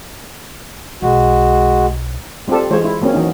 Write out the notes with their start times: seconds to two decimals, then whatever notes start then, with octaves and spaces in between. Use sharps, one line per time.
1.02 B1 G#3 F#4
2.48 G3 C4 F4 G4 A4
2.70 E3 G#3 F4 C5 C#5
2.84 E4
3.01 F#3 A#3 C4 C#4
3.14 E3 F#3 D#4